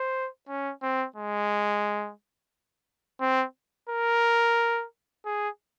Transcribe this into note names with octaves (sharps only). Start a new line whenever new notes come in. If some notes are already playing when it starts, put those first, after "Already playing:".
Already playing: C5
C#4
C4
G#3
C4
A#4
G#4